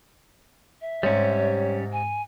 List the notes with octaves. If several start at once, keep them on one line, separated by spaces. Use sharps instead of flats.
E5
G#2 C3 G3 C#4 C#5
G#5